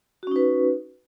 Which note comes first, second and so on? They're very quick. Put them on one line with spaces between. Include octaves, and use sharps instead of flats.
F#4 C#4 D#4 B4